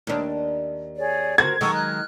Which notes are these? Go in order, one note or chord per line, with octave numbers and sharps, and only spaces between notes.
D#2 D4
G#4 C#5 D5
F#4 A#4 C5 G#6
D#3 F#3 G#3 A4 F#5 C#6
F6 F#6